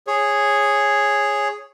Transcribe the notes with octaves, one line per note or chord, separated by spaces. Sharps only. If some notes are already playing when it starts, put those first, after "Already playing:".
G#4 C#5